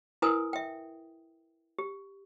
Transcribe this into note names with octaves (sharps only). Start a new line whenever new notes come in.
E4 A#4 B4 G#5 D#6
E5 G5
G4